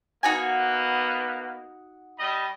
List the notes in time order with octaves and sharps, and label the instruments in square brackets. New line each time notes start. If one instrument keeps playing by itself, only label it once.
[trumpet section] A#3 B3 [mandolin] D#4 F#4 G#5
[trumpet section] G3 D#5 B5